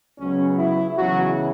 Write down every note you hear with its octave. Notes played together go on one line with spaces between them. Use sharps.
C#2 C#3 F#3 B3 C#4
E4
C#2 C#3 E3 F#3 B3 F#4